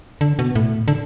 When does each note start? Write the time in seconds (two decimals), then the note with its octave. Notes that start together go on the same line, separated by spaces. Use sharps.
0.21 D3
0.39 B2
0.55 A2
0.88 D3